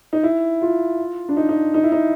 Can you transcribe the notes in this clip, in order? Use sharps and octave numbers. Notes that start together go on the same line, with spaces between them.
D#4
E4
F4
D4
D#4
D#4
D#4
E4
D#4